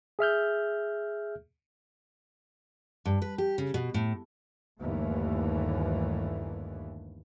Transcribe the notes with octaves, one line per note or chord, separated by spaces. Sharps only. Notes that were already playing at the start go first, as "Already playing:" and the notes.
G#4 E5 F6 G6
G2
B4
G4
C#3
B2
A2
G1 D#2 E3 A3